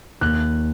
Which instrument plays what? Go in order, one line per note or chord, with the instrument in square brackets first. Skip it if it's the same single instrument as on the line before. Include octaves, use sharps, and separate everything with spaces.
[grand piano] D#2 F#6